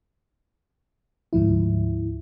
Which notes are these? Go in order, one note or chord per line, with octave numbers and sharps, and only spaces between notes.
D2 G#2 F3 E4